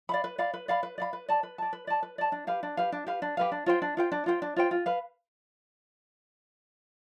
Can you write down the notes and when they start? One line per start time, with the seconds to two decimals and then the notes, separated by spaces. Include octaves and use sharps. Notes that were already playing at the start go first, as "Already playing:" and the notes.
0.09 D5 F5 B5
0.24 B4
0.38 D5 F5 B5
0.54 B4
0.68 D5 F5 B5
0.83 B4
0.98 D5 F5 B5
1.13 B4
1.28 D5 A5
1.43 B4
1.58 D5 A5
1.73 B4
1.87 D5 A5
2.03 B4
2.18 D5 A5
2.32 D4
2.47 G4 B4 F5
2.63 D4
2.77 G4 B4 F5
2.92 D4
3.07 G4 B4 F5
3.22 D4
3.37 G4 B4 F5
3.52 D4
3.66 F4 C5 G5
3.82 D4
3.97 F4 C5 G5
4.12 D4
4.26 F4 C5 G5
4.42 D4
4.56 F4 C5 G5
4.71 F4
4.86 B4 F5